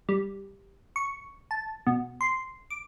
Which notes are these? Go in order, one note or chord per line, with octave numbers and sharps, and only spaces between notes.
G3
C#6
A5
B2
C6
D6